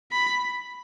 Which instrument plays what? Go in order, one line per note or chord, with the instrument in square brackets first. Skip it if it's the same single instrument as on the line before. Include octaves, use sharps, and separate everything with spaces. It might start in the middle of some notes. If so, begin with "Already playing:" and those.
[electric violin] B5